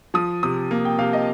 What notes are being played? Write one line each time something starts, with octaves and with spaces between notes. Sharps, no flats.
F3 D#6
C3 D#6
A#3
G5
C3 F5
D#5